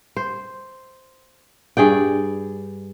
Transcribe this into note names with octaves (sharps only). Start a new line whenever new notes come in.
C5
G2 G#4 D5 G5